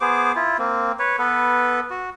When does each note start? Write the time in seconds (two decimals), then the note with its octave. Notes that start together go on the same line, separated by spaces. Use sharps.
0.01 B3 G#4 C5 D6
0.35 E4 F4
0.58 A#3 C4
0.99 B4 C#5
1.19 B3 A4 B4
1.90 F#4